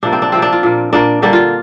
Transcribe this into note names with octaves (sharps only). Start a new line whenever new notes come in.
C3 F3 A#3 D4
C4
D4
C3 F3 A#3 C4
D4
F4
A#2 A#3
A#2 A#3 D4
D3 G3 A#3 D4
F4